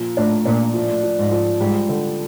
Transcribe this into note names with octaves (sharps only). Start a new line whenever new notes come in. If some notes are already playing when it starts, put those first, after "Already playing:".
Already playing: A#2 F3
A2 D4
A#2 D4
A2 F3
F3
G#2
F3
G#2 G3
D3